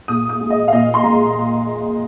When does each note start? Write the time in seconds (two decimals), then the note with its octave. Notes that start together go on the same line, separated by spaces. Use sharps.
0.08 A#2 D#6
0.29 D#6
0.41 G#3
0.50 D#5
0.68 F5
0.72 A#2 D#5
0.94 C6
1.04 G#3 A#5